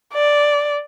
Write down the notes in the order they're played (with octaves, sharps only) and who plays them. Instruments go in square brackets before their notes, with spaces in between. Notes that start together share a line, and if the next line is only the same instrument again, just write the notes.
[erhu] D5